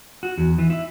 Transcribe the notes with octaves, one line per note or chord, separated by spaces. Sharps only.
F#4
E2
E3
E4